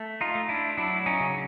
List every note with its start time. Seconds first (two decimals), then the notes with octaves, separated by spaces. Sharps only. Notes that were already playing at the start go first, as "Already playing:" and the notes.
Already playing: A3
0.21 D#4 F4
0.35 A3
0.49 D4 E4
0.78 F#3 D4 E4
1.06 C#4 D#4
1.20 C#3